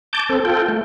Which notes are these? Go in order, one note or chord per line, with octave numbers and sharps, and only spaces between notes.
A5 D6 G6
C4 A4
F4 A4 G5
A3